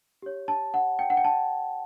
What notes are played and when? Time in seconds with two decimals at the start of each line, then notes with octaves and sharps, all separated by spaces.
0.22 G4 C#5
0.48 A5
0.74 F#5
0.99 G5
1.10 F#5
1.17 G5
1.24 A5